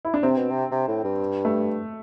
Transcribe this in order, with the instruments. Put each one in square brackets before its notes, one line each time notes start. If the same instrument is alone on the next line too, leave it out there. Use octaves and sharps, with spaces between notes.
[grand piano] E4
D4
[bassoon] C3 [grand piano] C4
[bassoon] B2
C3
C3
A2
G2
[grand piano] A3